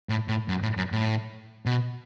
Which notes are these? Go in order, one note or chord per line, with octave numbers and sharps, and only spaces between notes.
A2
A2
F#2
A2
F#2
A2
B2